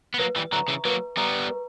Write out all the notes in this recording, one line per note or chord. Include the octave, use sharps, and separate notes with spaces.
B3
F#3 A#3 B4
E3 G3
D3 F#3 E5 A#5 C#6
C#3 E3
F#3 A#3 B4
G3 B3 E5 A#5 C#6
B4